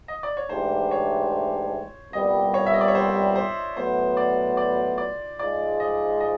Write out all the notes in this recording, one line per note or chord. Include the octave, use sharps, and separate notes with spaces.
D#5
D5
C#5
G#2 E3 A3 D4 G4 C5
C#5
C2 A#2 G3 B3 D#5
C#5
E5
D#5
D5
C#5
C5
C5
A2 F#3 B3 C5
D5
D5
D5
G#2 F3 G#3 D5
D#5
D#5